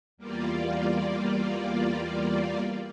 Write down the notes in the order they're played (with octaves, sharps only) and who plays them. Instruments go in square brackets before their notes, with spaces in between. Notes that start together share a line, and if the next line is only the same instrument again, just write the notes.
[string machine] E2 G3 A#3 F4 D5